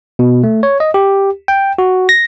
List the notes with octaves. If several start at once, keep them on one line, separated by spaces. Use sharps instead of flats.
B2
A3
C#5
D#5
G4
G5
F#4
A#6